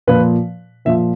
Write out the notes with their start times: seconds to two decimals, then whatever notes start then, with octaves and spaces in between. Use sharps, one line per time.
0.07 A#2 F3 B4
0.85 A#2 F3 E5